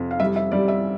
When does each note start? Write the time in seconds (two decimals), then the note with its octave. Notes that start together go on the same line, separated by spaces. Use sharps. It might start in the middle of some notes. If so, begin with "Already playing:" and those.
Already playing: F2 C3
0.11 F5
0.20 G3 E5
0.36 E5
0.51 G3 D5
0.68 E5